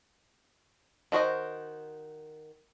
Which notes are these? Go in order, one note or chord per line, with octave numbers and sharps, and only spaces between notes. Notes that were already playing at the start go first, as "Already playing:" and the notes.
D#3 F#4 C5 D#5